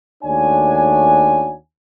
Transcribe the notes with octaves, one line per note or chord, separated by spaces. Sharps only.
D#2 A3 D4 F#4 C#5 G#5